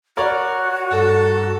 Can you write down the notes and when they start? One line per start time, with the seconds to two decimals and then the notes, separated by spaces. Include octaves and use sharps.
0.17 F#4 A#4 C#5 D5
0.90 G2 A4